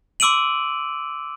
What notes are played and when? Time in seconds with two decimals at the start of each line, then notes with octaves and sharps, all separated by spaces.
0.20 C6 D6 E6 D7 D#7 F#7